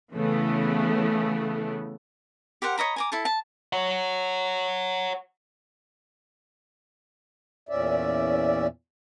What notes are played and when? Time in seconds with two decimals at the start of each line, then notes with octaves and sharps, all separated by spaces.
0.13 C#3 E3 A3 B3
2.62 G4 A#4 C5 F#5
2.78 C#5 D#5 A#5 B5
2.96 G#5 A#5 D6
3.12 E4 A4 A5
3.25 A5
3.73 C#5 F#5
7.69 E2 A#2 C#4 D5 E5